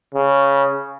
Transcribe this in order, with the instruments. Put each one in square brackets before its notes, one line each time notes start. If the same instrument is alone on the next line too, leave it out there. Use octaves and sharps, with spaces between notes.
[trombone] C#3